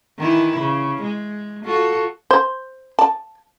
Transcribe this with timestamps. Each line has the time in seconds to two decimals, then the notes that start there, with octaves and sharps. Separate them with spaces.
0.18 D#3 E3 E4
0.59 C#3
1.02 G#3
1.64 F4 F#4 A4
2.31 C5
2.99 A5